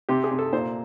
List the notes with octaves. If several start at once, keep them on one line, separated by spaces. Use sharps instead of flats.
C3 G4
G#4
C3
A4
A#2 C5